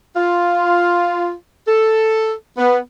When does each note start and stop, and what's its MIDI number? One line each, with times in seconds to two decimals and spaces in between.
0.17 1.31 65
1.67 2.33 69
2.58 2.78 59